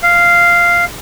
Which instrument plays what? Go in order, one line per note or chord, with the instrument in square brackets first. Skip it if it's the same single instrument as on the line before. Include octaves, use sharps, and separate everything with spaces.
[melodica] F5